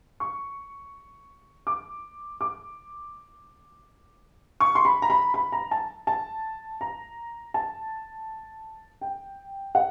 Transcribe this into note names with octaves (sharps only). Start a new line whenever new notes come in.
C#6
D6
D6
C#6
C6
B5
A#5
B5
B5
A#5
A5
A5
A#5
A5
G5
F#5